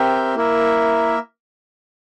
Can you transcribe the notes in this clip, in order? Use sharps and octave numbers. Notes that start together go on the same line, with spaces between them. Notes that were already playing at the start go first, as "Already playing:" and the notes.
Already playing: C4 G4 A#4 E5 G5
A#3 E4 A#4 E5